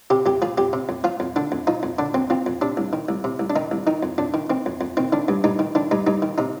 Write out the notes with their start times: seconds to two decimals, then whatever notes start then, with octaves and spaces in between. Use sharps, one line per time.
0.10 C3 G4
0.26 F2 G4
0.42 F3 G#4
0.58 F2 G4
0.73 C3
0.89 F2
1.04 F3 F4
1.20 F2
1.36 D3 D4
1.52 F2
1.67 F3 D#4
1.83 F2
1.99 D3 D4
2.14 F2 C4
2.30 F3 C4
2.46 F2
2.61 C3 D4
2.77 C2
2.93 D#3
3.09 C2
3.24 C3
3.40 C2
3.50 D4
3.56 D#3 D#4
3.71 C2
3.87 D#3 D#4
4.03 F2
4.18 F2 D4
4.34 D#3
4.50 D#3 C4
4.66 F2
4.81 F2
4.97 D#3 C4
5.12 D#3 D4
5.28 G2
5.44 G2 D#4
5.59 D#3
5.75 D#3 D4
5.91 G2 D#4
6.07 G2 D#4
6.22 D#3
6.38 C3 D#4